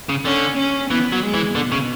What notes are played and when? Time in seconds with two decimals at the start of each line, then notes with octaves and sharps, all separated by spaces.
0.09 C#3
0.25 D3 C#4
0.58 C#4
0.90 E3 B3
1.12 F#3
1.23 G#3
1.34 E3
1.55 B2 D3
1.72 C#3